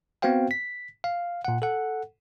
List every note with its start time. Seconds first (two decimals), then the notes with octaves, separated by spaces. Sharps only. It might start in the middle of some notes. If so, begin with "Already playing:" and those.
0.22 B3 C4 F#4 C5 F5 G5
0.51 B6
1.04 F5
1.45 A#2 F#5
1.62 A4 F#5